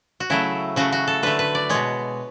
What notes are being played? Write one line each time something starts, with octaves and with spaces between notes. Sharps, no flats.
F#4
C#3 F#3 A3 E4
C#3 F#3 A3 F#4
F#4
A4
D3 A3 B4
B4
D5
B2 G#3 C#5